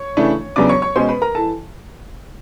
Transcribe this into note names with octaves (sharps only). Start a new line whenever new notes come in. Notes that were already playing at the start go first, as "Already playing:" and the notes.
Already playing: C#5 C#6
C#3 E3 A3 D4
E2 C#3 F#3 B3 D4 D5 D6
C#5 C#6
C#5 C#6
B2 G#3 C#4 C5 C6
B4 B5
A#4 A#5
E3 A4 A5